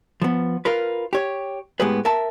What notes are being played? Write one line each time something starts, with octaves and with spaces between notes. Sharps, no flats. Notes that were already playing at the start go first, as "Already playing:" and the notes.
F3 B3
F4 A#4 B4
G4 C#5
A2 G#3 B3 G4 G#4 B4
A#4 E5 A5